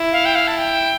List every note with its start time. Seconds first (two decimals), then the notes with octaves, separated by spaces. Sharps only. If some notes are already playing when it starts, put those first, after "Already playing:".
Already playing: E4
0.12 F5
0.25 G5
0.35 F5
0.47 A5
0.58 G5